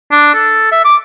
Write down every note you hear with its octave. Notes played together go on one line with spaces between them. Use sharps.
D4
A4
E5
D6